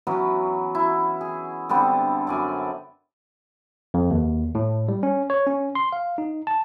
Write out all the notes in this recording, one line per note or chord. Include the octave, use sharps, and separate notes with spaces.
E3 F#3 B3 C#4
E4
G#4
D3 G3 B3 C4
F#2 D5 G#5
F2
D#2
A2
G3
C#4
C#5
C#4
C6
F5
D#4
A5